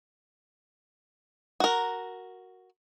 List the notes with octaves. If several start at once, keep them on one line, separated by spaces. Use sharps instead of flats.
F#4 A#4